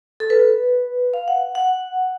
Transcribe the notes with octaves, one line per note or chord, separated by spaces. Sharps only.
A4
B4
F5
F#5
F#5